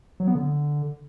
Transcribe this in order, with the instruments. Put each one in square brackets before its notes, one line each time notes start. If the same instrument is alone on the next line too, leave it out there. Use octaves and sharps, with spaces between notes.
[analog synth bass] F#3
B3
D3